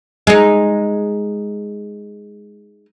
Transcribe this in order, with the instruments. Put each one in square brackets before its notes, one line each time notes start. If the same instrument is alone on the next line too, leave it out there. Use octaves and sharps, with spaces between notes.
[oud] G#3 D#4